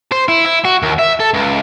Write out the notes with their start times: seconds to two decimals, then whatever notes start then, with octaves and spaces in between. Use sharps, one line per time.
0.12 C5
0.28 E4
0.46 E4
0.65 F#4
0.82 D#2
0.99 E5
1.20 A4
1.34 C#2